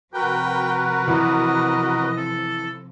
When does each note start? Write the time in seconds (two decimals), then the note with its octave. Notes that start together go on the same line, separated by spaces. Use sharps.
0.14 C3 F3 F#4 A#4 B4 G5
1.08 E3 D#5
2.17 A4